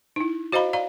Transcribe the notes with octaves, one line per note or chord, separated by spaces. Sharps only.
D#4 E4
F#4 C5 D#5 F5 A#5 B5
D5 F5 A#5